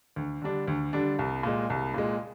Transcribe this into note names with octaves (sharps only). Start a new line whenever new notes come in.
D2
D3 G3 D4
D2
D3 G3 D4
C2
A#2 G#3
C2
A#2 G#3